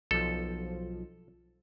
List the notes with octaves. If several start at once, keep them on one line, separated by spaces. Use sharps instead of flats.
B1 F3 A4